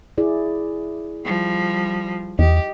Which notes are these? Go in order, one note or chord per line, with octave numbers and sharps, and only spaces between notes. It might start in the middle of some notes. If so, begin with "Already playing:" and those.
E4 G#4 D5
F3 G3
E2 G4 D#5